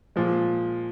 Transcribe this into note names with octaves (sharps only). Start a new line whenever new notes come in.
A#2 F3 G#3